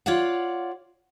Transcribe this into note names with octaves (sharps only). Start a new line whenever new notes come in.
F4 C#5 D5 F5 F#5